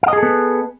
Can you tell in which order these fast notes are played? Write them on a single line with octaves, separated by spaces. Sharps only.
F5 D#5 G#4 A4 B3